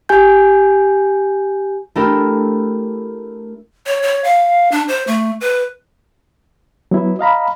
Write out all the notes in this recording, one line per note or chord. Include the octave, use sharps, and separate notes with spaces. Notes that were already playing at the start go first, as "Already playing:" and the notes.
G4 G#5 G6
A3 D4 E4 G4 A#4
C#5
C#5
F5
D4
C5
A3
B4
F#3 B3 E4
D#5 F5 A#5 B5